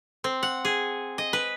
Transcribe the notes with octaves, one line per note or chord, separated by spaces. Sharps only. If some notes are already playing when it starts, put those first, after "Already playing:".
C4
F#5
G#4
D#5
B4